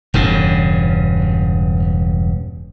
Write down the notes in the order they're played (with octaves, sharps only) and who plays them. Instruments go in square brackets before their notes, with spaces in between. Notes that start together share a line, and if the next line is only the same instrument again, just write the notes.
[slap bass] E1 G2 C#3